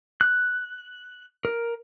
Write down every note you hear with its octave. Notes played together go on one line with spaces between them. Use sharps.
F#6
A#4